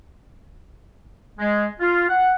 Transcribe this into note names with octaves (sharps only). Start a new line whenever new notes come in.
G#3
F4
F#5